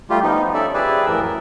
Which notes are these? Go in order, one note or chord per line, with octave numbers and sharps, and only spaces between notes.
G3 A3 F4 G4
F3 B3 D#4
C#4 A4 D5 E5
F3 G4 G#4 B4 D5 E5
F#2 A2 E3 A#4 E6
A#4